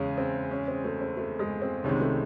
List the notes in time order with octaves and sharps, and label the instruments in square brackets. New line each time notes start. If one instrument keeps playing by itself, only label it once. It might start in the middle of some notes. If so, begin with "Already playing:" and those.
Already playing: [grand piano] E2 C#3 G#3 [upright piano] C#4
[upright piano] C4
C#4
C4
A3
C4
A3
G#3
C4
[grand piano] C2 C3 D#3 G#3 [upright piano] C#4
[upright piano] A3